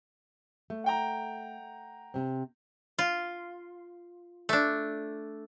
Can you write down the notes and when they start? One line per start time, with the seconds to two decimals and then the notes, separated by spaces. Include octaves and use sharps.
0.70 A3
0.84 F#5 G5 A#5
2.14 C3 C4
2.99 F4
4.49 A3 D4